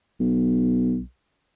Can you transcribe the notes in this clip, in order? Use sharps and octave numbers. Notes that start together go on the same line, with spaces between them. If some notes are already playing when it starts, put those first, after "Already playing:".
B1